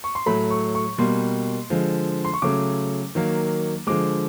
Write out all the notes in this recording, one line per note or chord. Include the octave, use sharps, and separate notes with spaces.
C#6
C6
A2 F#3 A3 B5
C#6
C#6
B2 G3 A#3 C6
D3 F3 G#3
C6
C#6
C#3 F#3 A3 D6
D#3 F#3 A#3
D3 F3 G#3 D6